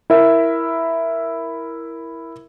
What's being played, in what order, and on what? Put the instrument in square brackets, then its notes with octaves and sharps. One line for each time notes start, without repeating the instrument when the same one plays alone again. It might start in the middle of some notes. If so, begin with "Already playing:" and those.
[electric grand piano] E4 A#4 E5